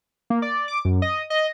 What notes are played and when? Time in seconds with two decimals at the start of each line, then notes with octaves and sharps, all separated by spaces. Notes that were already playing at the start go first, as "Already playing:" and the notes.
0.30 A#3
0.42 D5
0.68 D6
0.85 F#2
1.02 D#5
1.30 D#5